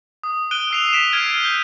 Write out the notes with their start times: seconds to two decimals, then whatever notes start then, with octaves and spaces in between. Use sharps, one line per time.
0.23 D#6
0.51 F#6 D7 D#7 G7
0.71 E6 C7 F7
0.93 B6 D7 E7
1.12 F6 G#6 A6 D7 D#7
1.43 G6 G7